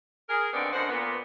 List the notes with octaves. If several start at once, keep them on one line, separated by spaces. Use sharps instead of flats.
G#4 A#4
A#2 D3 D#3 B3 C4 D5
F#2 D3 D#3 C5 F#5
A#2 B3